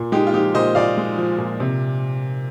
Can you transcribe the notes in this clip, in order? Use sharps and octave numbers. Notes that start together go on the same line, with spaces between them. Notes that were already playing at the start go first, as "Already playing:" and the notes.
Already playing: A#2
G#3 D#4 G4
F4
F3 D#4 G4
A#2 C5 D#5
A#2 D5 F5
G#3
F3
A#2
C3